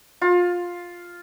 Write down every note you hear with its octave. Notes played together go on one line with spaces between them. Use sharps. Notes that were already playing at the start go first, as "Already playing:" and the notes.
F4